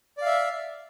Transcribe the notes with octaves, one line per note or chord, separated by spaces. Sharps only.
D5 E5 F5